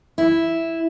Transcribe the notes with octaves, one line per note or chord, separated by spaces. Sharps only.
E4